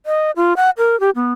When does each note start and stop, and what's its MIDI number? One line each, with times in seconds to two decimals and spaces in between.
0.06 0.31 75
0.36 0.54 65
0.57 0.70 78
0.78 0.99 70
1.00 1.10 67
1.15 1.33 59